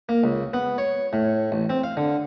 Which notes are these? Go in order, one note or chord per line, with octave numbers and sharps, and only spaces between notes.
A#3
C#2
B3
C#5
A2
A1
C4
F5
D3